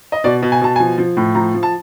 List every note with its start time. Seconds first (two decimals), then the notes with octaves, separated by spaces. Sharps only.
0.12 D#5
0.24 B2 D5
0.42 B2
0.52 G#5
0.61 B2 A5
0.76 F3 G#5
0.98 F3
1.17 A2
1.35 F3 A#5
1.54 F3
1.63 A5